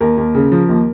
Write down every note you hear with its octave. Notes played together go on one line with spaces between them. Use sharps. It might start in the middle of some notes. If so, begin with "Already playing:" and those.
D#2 A#4
D#2
C#3
F3
D#2